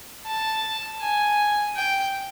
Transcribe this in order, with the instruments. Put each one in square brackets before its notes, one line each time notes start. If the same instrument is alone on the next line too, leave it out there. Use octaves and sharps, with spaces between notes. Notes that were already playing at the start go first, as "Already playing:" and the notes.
[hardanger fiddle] A5
G#5
G5